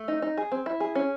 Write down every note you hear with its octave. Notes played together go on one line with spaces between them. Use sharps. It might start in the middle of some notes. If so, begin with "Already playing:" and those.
Already playing: A3
D#4
D#4
G#4
C4
E4
G#4
C#4